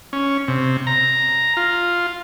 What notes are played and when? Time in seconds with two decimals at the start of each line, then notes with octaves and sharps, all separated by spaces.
0.13 C#4
0.48 C3
0.87 A#5
1.57 F4